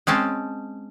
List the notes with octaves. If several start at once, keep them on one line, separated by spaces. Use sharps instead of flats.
G#3 C4 C#4 A5